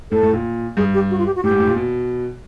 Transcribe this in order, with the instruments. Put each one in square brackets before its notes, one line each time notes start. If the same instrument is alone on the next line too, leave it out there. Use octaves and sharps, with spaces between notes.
[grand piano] A2 [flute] A4
[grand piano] A2
A#2
[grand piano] G2 [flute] G#4
[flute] G4
F#4
F4
G4
F#4
[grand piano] A2 [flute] G4
[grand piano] G#2
A2
A#2
B2